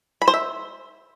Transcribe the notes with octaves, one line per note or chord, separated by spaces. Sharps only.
B5
C5
E5